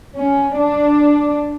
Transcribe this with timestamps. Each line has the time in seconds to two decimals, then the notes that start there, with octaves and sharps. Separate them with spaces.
0.18 C#4
0.59 D4